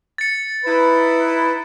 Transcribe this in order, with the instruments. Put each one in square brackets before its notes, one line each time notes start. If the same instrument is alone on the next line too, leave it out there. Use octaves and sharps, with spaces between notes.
[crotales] A6 C#7
[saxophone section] D#4 E4 [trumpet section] B4